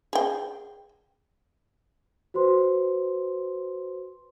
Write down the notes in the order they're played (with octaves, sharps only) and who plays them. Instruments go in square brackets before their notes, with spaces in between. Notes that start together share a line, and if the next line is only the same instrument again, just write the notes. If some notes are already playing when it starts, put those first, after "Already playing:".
[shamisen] G#4 G5
[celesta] F#4 B4 C5 C6